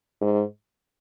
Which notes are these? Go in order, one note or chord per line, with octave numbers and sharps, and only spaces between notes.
G#2